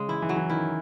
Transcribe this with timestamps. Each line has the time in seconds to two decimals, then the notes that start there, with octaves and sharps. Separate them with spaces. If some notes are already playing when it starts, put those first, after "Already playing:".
Already playing: C#3 G#3 C#4
0.08 E3 E4
0.22 E3
0.29 F#3
0.36 E3
0.49 D#3 E4